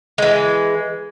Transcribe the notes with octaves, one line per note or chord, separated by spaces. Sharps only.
E3 G#3